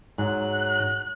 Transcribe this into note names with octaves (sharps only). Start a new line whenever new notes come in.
G#2 F#3 F#6